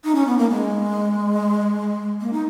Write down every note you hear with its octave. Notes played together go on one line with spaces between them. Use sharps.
D#4
C#4
B3
A#3
G#3
A#3
D#4